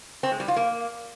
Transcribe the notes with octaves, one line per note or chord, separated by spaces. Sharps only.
C4
G#3
G3
F4
A#3